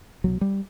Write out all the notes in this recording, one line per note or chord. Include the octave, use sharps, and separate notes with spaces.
C2 B2 F#3
G3